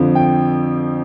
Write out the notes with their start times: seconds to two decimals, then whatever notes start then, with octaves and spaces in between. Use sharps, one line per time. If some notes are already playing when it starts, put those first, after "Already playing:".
Already playing: F2 D3 F3
0.15 G5